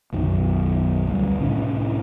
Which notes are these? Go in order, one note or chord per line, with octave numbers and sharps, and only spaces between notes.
B1 F#2 D#3
D2 G3
C2 A2 C#4 D4